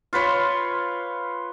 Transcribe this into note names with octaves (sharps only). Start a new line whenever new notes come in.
F4 B4 C#5 C6